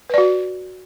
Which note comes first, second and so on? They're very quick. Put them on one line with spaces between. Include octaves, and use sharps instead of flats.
B4 D5 F#4